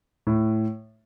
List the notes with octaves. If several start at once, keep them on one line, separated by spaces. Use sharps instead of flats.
A2